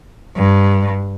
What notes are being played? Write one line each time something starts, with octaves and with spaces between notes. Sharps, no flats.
G2